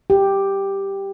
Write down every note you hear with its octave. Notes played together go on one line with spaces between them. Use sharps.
G4